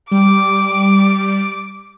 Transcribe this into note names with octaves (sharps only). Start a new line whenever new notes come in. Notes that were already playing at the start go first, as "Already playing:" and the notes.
G3 D6